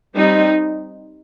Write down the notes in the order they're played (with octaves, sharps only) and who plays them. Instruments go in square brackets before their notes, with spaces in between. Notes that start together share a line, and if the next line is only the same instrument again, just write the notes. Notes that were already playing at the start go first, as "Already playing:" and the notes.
[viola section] G3 C4 D#4